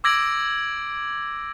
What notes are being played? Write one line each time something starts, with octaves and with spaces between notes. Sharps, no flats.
D6 E6 G#6 A#6 D7 F#7